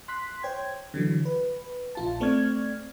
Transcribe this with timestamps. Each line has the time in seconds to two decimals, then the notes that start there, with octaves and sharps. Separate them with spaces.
0.08 C6 F#6 B6
0.43 C5 C#5 G5 G#6
0.94 D3 E3 F#3
1.25 B4
1.95 A#1 F4 A5
2.20 A3 C4 D5 C#6 F6 G#6